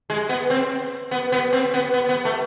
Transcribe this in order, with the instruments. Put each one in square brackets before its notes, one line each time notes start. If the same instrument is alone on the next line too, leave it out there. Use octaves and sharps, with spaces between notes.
[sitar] G#3
B3
C4
B3
B3
C4
B3
B3
B3
A3